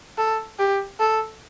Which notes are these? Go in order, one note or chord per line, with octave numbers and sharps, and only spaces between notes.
A4
G4
A4